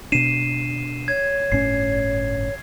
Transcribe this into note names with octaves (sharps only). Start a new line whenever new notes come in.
B2 D4 C7 D#7 E7
C#5 G#6
G1 A2 C#4 C7